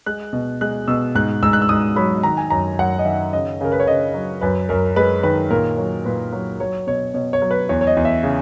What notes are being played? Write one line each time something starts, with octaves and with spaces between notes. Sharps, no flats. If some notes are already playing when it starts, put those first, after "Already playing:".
G#3 F#6
B2
G#3 F#6
B2 E6
G#2 F#6
G#2 E6
F#6
E6
G#2 D#6
F#3 B5
D#3 A#5
G#5
F#2 A#5
F#2 F#5
D#5
D#3 E5
C#3 D#5
C#3 A#4
B4
C#5
C#3 D#5
F#3
F#2 B4
F#2 A#4
G#3 B4
D#3 B4
A#2 A#4
F#3
A#2 B4
F#3
F#3 C#5
B2 C#5
B2 C#5
C#5
F#3
B4
E2 C#5
C#5
D#5
E2
E5
C#3